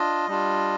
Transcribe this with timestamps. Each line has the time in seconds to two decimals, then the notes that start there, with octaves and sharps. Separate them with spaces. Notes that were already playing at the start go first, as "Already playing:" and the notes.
Already playing: D4 F4 D#5
0.28 G3 D4 F4